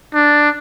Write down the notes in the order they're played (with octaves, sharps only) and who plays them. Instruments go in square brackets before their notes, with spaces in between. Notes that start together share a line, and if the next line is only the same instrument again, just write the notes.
[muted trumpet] D4